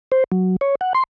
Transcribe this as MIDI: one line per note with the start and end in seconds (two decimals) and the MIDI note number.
0.12 0.24 72
0.32 0.56 54
0.61 0.75 73
0.81 0.93 78
0.94 1.03 84